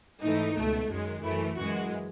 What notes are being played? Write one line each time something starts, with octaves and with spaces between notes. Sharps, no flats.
G#2 E3 A3 D#4
C#2 B2 A3
F#2 D#3 G#3
F#2 E3 A3 E4
F#2 E3 G#3 F#4